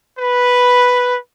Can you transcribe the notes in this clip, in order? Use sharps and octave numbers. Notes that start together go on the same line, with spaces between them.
B4